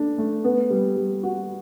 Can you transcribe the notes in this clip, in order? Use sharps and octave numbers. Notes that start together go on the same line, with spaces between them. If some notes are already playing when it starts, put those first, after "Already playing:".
Already playing: D4 A4
A3
B3
G3
G3
F#4